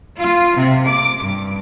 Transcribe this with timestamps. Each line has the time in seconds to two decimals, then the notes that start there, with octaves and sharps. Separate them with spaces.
0.17 F4
0.56 C3
0.87 D6
1.22 G2